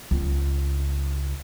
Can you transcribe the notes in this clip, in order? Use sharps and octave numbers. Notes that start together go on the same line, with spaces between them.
C#2